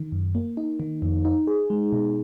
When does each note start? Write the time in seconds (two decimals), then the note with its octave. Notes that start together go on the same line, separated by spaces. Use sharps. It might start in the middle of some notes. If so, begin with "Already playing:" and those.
Already playing: D#3
0.12 F#2
0.35 A#3
0.57 D#4
0.80 D#3
1.02 F2
1.25 D#4
1.47 G#4
1.70 G#3
1.92 B2